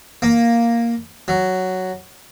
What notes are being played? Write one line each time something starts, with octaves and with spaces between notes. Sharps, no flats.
A#3
F#3